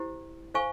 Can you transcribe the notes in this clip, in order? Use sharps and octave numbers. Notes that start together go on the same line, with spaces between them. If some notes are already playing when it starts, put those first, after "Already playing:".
Already playing: E4 G4 C5
C5 F5 G#5 C#6